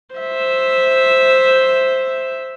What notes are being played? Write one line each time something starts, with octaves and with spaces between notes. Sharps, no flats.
C5 E5